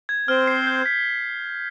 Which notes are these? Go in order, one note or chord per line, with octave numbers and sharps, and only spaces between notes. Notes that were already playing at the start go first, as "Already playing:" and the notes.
G#6
C4 C5 F6
C7
G6
B6